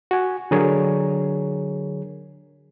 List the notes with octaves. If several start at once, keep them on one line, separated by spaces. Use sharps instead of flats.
F#4 G#5
D3 F#3 G#4 A#4 C#5